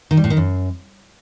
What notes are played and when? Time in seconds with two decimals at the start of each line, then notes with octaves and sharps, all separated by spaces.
0.11 D#3
0.17 G3
0.24 A2
0.30 D#3
0.37 F#2